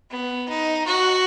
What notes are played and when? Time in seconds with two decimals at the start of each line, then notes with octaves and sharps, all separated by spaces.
0.10 B3
0.49 D#4
0.87 F#4